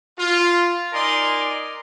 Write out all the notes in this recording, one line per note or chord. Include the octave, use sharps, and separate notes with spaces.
F4
D#4 A#4 D5 G#5 C6